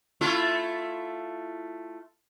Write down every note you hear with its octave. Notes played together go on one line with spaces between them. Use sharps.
A3 E4 F4